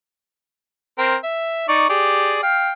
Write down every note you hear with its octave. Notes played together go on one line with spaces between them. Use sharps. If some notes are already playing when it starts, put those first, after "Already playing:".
C4 A#4 G5
E5
D#4 D5 C#6
G4 G#4 D5
F5 G5